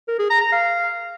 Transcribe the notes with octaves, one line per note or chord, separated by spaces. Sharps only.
A#4
G#4
A#5
A#5
F5